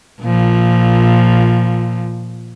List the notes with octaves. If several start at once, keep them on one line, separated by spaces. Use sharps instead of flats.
A#2 F3